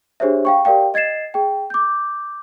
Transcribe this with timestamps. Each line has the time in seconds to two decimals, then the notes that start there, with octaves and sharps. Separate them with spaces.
0.20 D4 G4 G#4 C5 C#5 E5
0.45 F5 G5 C#6
0.65 G4 A#4 D5 F5 G5
0.94 D#5 G#6 A6 C7 E7
1.34 G#4 G5
1.70 D6 G6